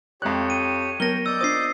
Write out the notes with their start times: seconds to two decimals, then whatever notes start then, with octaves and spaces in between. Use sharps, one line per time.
0.22 F2 G#3 G4 C#5 D5 F#6
0.50 B5 D#7
0.74 F5
1.00 F#3 B3 A#4 C#5 G5 A5 A#6 G7
1.26 D5 D#5 E6 G6
1.41 D4 F4 C5 D#6 C7